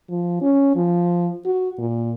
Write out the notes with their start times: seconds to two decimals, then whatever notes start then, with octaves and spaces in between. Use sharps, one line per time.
0.10 F3
0.42 C#4
0.76 F3
1.46 F#4
1.78 A#2